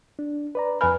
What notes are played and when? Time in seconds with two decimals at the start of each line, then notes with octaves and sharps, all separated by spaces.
0.19 D4
0.55 B4 D5 A#5
0.81 F2 B4 G#5 B5 F6